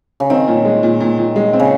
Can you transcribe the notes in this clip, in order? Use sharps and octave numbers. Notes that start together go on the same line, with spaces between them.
C#3
D#3 C4
A#2
G#3
A#2
A#2
A#2
G#3
C4
C#3